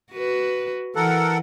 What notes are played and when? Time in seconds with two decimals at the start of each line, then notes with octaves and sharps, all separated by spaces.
0.12 F#4 B4
0.96 E3 A4 A#4 F#5